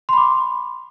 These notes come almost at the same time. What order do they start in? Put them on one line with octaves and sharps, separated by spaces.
C6 B5 D6